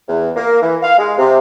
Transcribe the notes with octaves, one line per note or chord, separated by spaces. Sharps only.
E2
A#3
E3
F5
G#3
C3